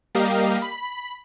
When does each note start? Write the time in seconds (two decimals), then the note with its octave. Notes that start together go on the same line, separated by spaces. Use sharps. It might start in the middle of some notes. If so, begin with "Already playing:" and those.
0.15 G3 A#3 G4 A#4 D#5 F5
0.62 B5